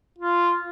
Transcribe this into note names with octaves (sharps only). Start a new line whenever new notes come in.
F4